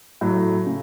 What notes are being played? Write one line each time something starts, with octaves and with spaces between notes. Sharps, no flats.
A2 F#3 A3
C#3